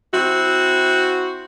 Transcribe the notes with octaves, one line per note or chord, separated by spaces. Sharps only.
C4 E4 F#4